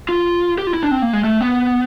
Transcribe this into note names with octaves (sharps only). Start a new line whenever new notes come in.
F4
G4
F4
E4
D4
C4
A#3
G#3
A3
B3